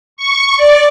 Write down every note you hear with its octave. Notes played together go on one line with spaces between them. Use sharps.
C#6
D5